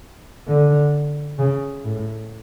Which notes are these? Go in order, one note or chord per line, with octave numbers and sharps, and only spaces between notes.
D3
C#3
A2